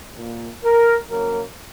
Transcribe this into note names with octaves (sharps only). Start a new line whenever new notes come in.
A#2 A#3
A#4
C#3 F#3 A#3 A#4